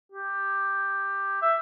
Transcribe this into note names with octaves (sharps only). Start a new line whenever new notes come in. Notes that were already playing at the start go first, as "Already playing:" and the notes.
G4
E5